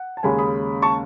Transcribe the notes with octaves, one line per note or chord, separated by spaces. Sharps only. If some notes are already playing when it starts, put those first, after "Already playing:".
Already playing: F#5
A5
D#2 C#3 G#3 C#4 G#5 B5
B5 D#6
A5 C#6